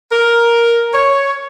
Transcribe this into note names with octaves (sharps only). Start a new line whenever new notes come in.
A#4
C#5